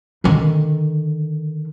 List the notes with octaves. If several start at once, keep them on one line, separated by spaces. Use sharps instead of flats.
D3 D#3